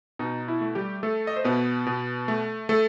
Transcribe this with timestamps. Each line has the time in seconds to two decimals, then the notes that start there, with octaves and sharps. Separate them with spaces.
0.19 B2 D#4
0.48 E4
0.61 A3
0.75 G3 G4
1.03 A3 A4
1.27 D#5
1.36 C5
1.44 B2 B3 B4
1.86 B2
2.28 A3
2.69 A3 A4